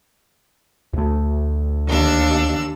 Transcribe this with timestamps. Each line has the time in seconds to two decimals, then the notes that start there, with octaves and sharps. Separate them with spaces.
0.93 D2 A3
1.87 D#2 D4 E6